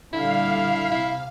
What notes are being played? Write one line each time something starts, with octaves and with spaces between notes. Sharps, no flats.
A#2 D3 G3 E4 F5
C3 E4